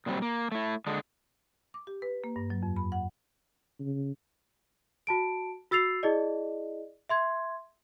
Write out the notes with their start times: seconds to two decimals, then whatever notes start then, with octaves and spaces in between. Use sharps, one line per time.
0.06 A#2 F#3 G3 C4
0.22 A#3
0.52 A3 E4
0.87 D3 G#3 D4
1.74 D6
1.87 G4
2.02 B4
2.24 A#3
2.36 G2
2.50 F#3
2.63 F2
2.76 B5
2.92 F#5
3.80 C#3
5.07 F#4 A5 D7
5.71 F#4 E6 A6 C7 F7
6.03 E4 G#4 D5 D#5
7.09 E5 C6 G#6